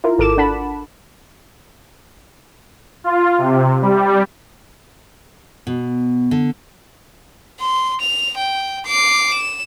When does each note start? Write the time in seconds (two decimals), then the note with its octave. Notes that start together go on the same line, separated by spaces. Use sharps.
0.04 E4 F4 A#4
0.18 G#1 A4 A#4 D6 E7
0.38 D4 F#5 A5 B5
3.04 F4
3.38 C3
3.82 G3
5.67 B2
6.31 D3
7.60 C6
8.01 F7
8.38 G5
8.86 D6 C7
9.34 E7